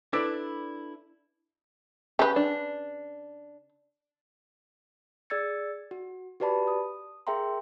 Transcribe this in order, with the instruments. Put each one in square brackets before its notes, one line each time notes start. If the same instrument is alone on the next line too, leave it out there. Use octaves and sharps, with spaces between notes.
[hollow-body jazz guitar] D4 E4 A4 B4 D5
[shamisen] C#3 B4 [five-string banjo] G4
[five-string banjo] D4
[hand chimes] G#4 D5 E6 G#6 A6 C#7
F#4
F#4 G4 B4 D5 A5 B5
D#6
G#4 A#4 E5 G5 A#5 C6